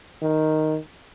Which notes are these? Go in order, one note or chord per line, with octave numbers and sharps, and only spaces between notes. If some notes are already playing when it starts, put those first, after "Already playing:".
D#3